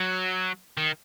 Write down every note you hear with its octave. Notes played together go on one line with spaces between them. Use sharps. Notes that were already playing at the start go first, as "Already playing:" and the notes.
Already playing: F#3
D#3